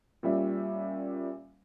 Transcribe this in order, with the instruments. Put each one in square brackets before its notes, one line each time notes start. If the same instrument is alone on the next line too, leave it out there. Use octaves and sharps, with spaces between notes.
[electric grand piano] A#2 G3 C#4 E5